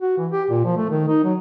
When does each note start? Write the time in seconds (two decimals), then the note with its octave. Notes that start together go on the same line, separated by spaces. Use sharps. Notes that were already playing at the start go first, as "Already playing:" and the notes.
0.01 F#4
0.18 E3
0.32 G4
0.50 A#2
0.64 F3
0.77 A3
0.89 D#3
1.08 D#4
1.24 F#3